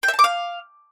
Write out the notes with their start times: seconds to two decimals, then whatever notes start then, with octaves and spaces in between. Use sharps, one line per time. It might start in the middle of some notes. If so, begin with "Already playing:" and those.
0.03 G5
0.08 E5
0.14 A5
0.19 D6
0.24 F5